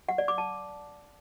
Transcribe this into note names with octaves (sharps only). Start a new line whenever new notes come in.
F#5
D5
D6
A5